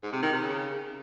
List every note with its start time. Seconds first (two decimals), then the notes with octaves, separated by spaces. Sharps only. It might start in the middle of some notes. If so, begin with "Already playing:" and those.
0.03 G#2
0.13 C3
0.23 D#3
0.33 C3
0.42 C#3